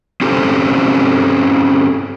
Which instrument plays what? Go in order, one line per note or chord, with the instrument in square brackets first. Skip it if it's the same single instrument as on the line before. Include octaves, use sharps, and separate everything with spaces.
[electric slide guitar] C4 C#4 G4 A4 C5